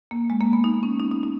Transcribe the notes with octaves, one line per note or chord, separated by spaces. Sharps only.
A#3
G#3
A#3
B3
D#4
C#4
D#4
D#4
D#4